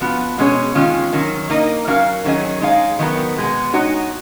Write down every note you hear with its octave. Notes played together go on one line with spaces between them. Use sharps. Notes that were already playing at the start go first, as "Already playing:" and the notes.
F3 B3 F#4
B2 G#3 C#4 G#4 C#5
D#3 G#3 C#4 F4
D#3 F#3 C#4
A#3 D#4 A#4 D#5
F#3 C#4 F#4 A#4 F5
D#3 F#3 C#4 G#4 D#5
G#3 D#4 G#4 C#5 F5
D#3 F#3 B3 F#4 A#4
B2 G#3 B3
G#3 D#4 F#4 C#5